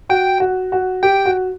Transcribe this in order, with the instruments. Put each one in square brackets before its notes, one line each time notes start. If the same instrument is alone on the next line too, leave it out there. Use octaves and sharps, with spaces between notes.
[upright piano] F#4 [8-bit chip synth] G5
[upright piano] F#4
F#4
[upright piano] G4 [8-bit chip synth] G5
[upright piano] F#4